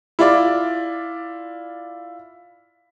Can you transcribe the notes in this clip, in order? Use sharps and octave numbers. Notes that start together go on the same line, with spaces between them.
E4 F4 D5 D6